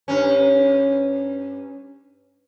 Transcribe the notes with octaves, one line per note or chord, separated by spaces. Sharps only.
G2 C#4